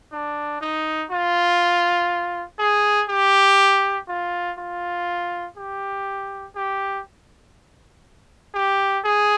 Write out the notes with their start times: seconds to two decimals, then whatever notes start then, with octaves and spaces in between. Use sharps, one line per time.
0.12 D4
0.61 D#4
1.11 F4
2.59 G#4
3.09 G4
4.08 F4
4.58 F4
5.57 G4
6.56 G4
8.54 G4
9.04 G#4